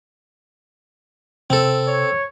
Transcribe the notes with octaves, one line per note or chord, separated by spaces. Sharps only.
C3 C4 A4
C#5